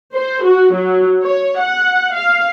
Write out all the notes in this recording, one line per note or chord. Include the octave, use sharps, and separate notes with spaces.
C5
F#4
F#3
C#5
F#5
F5